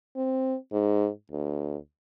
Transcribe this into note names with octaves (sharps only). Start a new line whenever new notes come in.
C4
G#2
D2